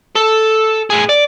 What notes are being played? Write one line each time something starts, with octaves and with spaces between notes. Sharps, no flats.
A4
A2 G#4
D5